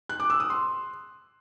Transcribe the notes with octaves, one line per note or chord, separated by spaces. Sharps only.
F#6
D6
E6
D#6
C6